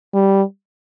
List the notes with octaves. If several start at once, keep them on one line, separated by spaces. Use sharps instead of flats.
G3